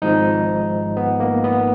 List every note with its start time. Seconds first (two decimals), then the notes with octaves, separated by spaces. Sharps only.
0.02 G#1 G#2 F3 D#4
0.97 B3
1.20 A#3
1.44 B3